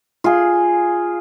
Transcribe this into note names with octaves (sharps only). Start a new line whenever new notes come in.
F4 G#4